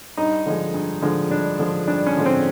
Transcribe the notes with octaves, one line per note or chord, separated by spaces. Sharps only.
G2 D#4
D3 F3 G#3
G2
D3 F3 G#3
G2 D4
D3 F3 G#3
G2 D4
C#4
D3 F3 G#3
C4